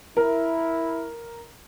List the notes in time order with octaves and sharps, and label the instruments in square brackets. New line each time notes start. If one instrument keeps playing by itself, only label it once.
[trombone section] E4 [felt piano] A#4